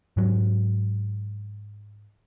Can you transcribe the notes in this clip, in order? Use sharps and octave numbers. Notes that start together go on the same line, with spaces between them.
G#2 F#3